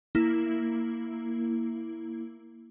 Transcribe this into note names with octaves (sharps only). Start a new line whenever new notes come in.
A#3 E4